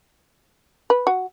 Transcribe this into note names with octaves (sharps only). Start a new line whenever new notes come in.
B4
F#4